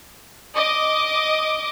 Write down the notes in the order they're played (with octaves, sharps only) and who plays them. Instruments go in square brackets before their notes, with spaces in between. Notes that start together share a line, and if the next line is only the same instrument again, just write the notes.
[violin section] D#5 D6